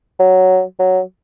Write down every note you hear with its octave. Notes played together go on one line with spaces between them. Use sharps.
F#3
F#3